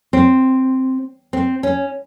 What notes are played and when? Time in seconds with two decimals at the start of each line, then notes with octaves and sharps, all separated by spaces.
0.13 C4
1.33 C4
1.63 C#4